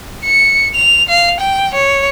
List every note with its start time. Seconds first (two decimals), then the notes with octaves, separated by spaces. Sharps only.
0.24 C#7
0.75 F7
1.09 F5
1.40 G5
1.74 C#5